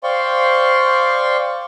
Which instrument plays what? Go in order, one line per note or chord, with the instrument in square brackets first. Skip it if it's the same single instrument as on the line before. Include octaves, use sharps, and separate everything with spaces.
[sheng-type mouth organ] C5 D5 F5 G5 C6 C#6